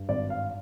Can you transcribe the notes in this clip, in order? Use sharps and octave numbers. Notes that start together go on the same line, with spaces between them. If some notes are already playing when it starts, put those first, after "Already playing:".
Already playing: G2
G#1 D5
F5